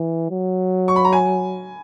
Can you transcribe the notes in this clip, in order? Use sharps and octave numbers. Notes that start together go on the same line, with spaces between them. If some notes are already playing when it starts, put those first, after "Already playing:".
Already playing: E3
F#3
C#6
B5
A#5
G#5